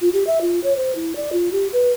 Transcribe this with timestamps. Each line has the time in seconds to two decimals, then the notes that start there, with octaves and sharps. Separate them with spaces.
0.01 F4
0.13 G4
0.27 E5
0.41 F4
0.64 C#5
0.76 C5
0.96 E4
1.16 D5
1.33 F4
1.52 G4
1.73 B4